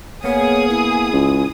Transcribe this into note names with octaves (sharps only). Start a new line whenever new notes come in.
A#3 B3 G#4 C#5 D#6
E4
C#2